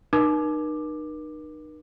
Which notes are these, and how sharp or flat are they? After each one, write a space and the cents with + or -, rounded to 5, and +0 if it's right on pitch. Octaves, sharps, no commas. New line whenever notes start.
D#4 -35 A#4 +45 D6 +10